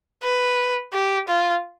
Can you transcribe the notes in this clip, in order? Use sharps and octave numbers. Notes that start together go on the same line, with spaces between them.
B4
G4
F4